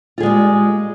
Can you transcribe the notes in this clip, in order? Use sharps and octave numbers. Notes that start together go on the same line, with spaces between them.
G3 G#3 F4 G#4